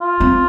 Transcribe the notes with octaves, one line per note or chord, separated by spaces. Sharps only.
F4
C4